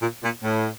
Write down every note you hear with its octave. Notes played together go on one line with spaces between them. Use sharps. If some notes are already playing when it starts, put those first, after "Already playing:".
A#2
A#2
A2